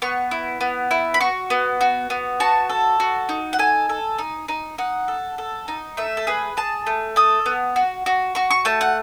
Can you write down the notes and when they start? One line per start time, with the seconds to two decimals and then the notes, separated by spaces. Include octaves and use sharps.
0.02 B3 C#6
0.31 E4
0.61 B3
0.91 E4
1.14 B5
1.21 F#4 C#6
1.50 B3
1.81 F#4
2.10 B3
2.40 F#4 A5
2.69 A4
3.00 F#4
3.29 D#4
3.53 F#5
3.59 A4 G#5
3.89 A4
4.18 D#4
4.48 D#4
4.78 D#4 F#5
5.08 A4
5.38 A4
5.68 D#4
5.97 A3 E5
6.17 A4
6.27 G#4 B4
6.57 G#4 A5
6.87 A3
7.16 A4 D#6
7.46 B3
7.76 F#4
8.06 F#4
8.35 F#4 C#6
8.51 C#6
8.65 A3 A5
8.81 F#5